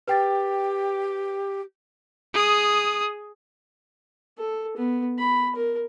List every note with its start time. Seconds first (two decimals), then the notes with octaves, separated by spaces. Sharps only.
0.08 G4 B4 G5 A6
2.34 G#4 D#6
4.38 A4
4.77 B3
5.18 B5
5.56 A#4